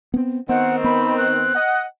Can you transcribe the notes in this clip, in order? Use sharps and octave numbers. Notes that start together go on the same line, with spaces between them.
B3 C4
D#3 B3 C4 F#5
B3 B5
F#6
D#5 F#5